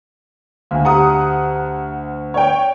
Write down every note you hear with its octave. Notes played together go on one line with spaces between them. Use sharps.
D2 F5 G#5
G4 F#5 A#5 D#6
C#5 D5 G5